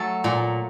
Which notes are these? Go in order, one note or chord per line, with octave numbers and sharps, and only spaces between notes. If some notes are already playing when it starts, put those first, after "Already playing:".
Already playing: F#3 A3 A4
A#2